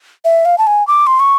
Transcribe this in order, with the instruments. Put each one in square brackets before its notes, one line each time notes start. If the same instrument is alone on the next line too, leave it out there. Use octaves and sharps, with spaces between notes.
[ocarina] E5
F5
A5
G#5
D6
C6
C#6